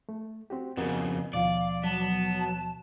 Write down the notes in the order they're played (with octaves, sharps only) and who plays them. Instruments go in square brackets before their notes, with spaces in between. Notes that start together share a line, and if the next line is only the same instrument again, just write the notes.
[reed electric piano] A3
C4 F#4 G4
[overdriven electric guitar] F2 C#3 [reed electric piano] B3 F#4 A#4
[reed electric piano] D#2 B2 F3 [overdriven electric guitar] D5 [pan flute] F5
[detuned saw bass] F#3 [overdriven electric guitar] B3 [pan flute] A5